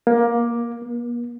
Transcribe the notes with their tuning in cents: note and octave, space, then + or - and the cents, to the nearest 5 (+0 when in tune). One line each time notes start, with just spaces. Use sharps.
A#3 +15
A#3 +45